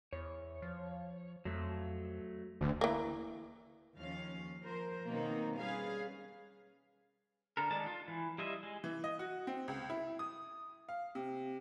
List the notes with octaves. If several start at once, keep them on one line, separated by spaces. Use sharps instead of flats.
E2 C#5
F3
F2 F#3 A3
D#1 D2
E3 A#3
D#2 F3 C#4 F5
F3 A#4 C5
B2 D#3 F#3 A#3 C4 D#4
G3 C#4 G#4 B4 F5
D3 A4 A#4
D#3 G#3 D5 A5
F4
E3
G3 E4 F4 D#5 E5
G#3
E3
D#5
F#4
C4
C#2
E4
D#6
F5
C3